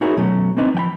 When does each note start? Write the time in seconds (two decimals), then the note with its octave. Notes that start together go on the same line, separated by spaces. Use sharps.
0.01 D#4 E4 F#4 G#4 A#4 C#5
0.17 B2 F#3 A3 C#4
0.57 A#3 C4 D4 D#4 B4 D#5
0.74 F3 G5 B5